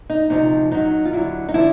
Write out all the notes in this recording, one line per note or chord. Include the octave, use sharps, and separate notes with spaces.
D#4
D2 C3 F3 D#4
F#2 D#3 F#3 D#4
F4
D#2 D3 F#3 E4
D#4
D3 F3 E4